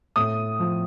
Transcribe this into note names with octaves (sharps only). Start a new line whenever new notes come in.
A2 D#6
F3